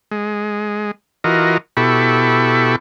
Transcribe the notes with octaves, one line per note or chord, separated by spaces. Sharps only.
G#3
E3 F4 F#4 A#4 D#5
B2 E4 G4 A4 B5 C#6